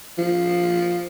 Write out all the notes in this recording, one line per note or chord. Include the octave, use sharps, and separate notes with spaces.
F3